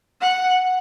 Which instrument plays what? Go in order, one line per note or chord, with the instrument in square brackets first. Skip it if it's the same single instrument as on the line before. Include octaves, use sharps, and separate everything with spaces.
[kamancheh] F#5